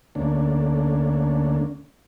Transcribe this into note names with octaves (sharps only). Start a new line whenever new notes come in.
D2 D3 A3 A#3 C#4 D4